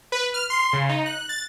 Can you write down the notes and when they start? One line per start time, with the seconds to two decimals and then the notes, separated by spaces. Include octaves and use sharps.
0.12 B4
0.34 F6
0.50 C6
0.73 C#3
0.89 D#4
1.06 F#6
1.29 A6